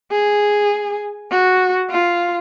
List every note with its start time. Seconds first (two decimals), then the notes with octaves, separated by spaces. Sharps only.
0.11 G#4
1.31 F#4
1.90 F4